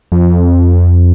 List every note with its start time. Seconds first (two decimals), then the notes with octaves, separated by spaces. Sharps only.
0.12 F2